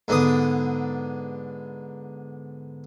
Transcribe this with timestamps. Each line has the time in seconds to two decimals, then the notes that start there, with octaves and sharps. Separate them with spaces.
0.08 G#2 D3 B3 D#6